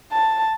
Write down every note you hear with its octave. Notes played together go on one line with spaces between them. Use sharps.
A5